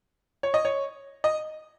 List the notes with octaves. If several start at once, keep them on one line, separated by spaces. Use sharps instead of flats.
C#5
D#5
C#5
D#5